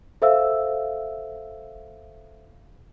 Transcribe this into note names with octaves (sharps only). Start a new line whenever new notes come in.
A4 C5 E5 F5 E6